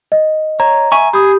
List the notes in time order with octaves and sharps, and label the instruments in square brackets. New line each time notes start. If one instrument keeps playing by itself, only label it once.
[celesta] D#5
[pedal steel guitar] C#5 [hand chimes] A#5
[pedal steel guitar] E5 G#5 C#6
[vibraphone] G4 [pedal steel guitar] G#4 [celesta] B5 D#6